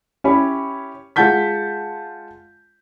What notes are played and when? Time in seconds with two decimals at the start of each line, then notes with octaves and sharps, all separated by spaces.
0.24 C#4 E4 G4 C#5 B5
1.16 G#3 F4 F#5 A5 G6 B6